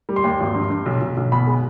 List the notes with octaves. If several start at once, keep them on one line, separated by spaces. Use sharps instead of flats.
G3
C6
D#2
G#1
G2
G2
B1
B1
B1
B2 B5
G#3